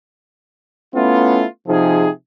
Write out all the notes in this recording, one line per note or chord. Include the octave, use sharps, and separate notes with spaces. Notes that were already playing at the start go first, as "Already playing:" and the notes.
A3 B3 C#4 E4 F4
C3 F3 D#4 G#4